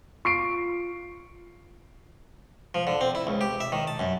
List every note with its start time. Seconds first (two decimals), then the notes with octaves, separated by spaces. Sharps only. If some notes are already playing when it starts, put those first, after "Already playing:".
0.25 F4 C#6 C7 D7
2.75 F3
2.87 D3
3.01 C4
3.15 E4
3.27 C#2
3.41 G4
3.60 E5
3.72 D#3
3.87 A5
3.99 F#2